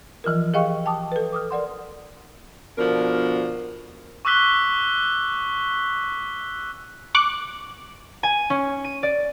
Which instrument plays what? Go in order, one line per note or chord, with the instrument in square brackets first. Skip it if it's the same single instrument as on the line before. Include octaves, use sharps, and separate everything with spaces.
[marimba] E3 F3 F4 A#4
G4 G#4 D#5 F5 G5 C#6
G5 A5 D6 D#6
A4 B4
D6 D#6 F6
A#4 D5 F#5 C6
[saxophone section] B2 D3 F3 D4 A#4
[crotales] C#6 D6 E6 F#6 B6 G7
[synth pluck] C#6 D6 F#6
[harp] G#5
C#4
D#7
D5